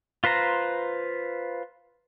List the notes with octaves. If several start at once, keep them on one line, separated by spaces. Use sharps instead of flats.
F4 B4 C5 A#5